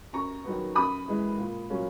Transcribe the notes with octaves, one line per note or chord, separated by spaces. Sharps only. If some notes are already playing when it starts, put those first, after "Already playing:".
F#2 A#5 C#6
D#3 F#3 B3
F#2 B5 D#6
E3 G#3
A#2
F#3 A#3 C#4